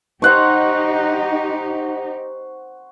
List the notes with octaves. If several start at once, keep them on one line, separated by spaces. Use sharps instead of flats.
D#4 G4 C5 F#5 C#6